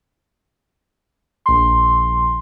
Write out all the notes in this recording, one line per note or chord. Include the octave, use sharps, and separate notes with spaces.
A#1 C6